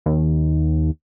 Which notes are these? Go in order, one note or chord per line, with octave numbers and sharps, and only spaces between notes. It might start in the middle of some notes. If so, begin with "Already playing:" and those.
D#2